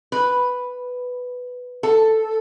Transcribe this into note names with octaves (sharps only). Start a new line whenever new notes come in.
B4
A4